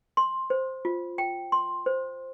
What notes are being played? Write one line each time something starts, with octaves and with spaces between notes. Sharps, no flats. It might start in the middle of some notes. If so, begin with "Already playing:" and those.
C6
C5
F4
G5
C6
C5